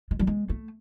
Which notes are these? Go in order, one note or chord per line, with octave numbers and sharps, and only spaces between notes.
G#3
G3
G#3
A3